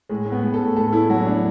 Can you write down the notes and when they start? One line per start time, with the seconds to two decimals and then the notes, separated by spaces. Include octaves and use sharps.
0.09 A2 G#3
0.26 A2
0.32 B3
0.42 A2
0.54 A4
0.59 A2
0.76 A2 A4
0.93 A2 E4
1.09 F#3 F#4
1.20 C#4
1.26 F#3 D4